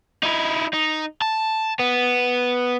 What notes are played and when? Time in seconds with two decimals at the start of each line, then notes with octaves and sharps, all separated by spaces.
0.23 D#4 E4
0.73 D#4
1.21 A5
1.79 B3